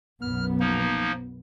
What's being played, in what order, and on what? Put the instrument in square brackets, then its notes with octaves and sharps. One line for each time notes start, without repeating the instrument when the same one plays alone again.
[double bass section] B1 F#2 B3 [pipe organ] F6
[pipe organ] F3 A#3 D#4